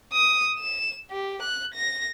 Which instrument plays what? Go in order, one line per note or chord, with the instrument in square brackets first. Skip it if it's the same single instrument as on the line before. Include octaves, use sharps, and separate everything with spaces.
[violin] D#6
E7
G4
F#6
A#6